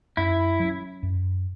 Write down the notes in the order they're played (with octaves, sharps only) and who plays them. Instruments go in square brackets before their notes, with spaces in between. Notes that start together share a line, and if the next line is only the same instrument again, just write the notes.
[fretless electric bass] F#2 [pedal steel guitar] E4
[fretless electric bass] F#3 C#4
F#2